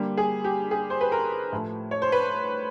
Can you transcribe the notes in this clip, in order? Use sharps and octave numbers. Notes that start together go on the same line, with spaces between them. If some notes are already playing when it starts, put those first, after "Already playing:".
Already playing: D3 G3 A#3
G#4
G4
G#4
C5
B4
A#4
A2 F3 A3
C#5
C5
B4